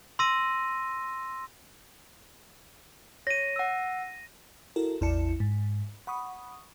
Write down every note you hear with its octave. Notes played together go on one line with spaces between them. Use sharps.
C6 E6 A#6 D#7
C#5 A#6 D#7
F#5 E6
E4 F#4 A4 A#4
A1 E2 E4 D5 A5 C#7
G#2
F#5 B5 C#6 D#6